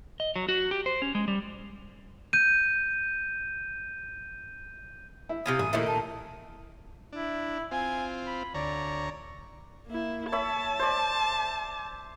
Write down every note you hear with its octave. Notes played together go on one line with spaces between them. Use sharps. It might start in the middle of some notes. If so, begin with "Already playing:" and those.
D#5
F#3
F#4
G4
C5
C#4
G#3
G3
G6 D#7
E4
C3 F4 G#5 D#6
A1 G#5
A#2 D#3 A3 A#3 D#4 E4
A5
D4 E4
C4 F4 G#5
B5
D2 C#5 D5 A#5
A#3 E4
C#5 E5 A5 B5
C5 D5